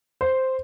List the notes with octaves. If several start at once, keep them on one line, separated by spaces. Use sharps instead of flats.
C5